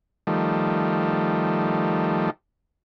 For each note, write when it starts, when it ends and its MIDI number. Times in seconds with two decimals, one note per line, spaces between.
0.27 2.30 51
0.27 2.30 53
0.27 2.30 55
0.27 2.30 57